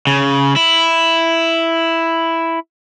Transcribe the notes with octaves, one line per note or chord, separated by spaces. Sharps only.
C#3
E4